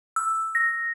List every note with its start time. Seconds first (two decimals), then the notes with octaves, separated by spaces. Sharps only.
0.16 E6
0.55 A#6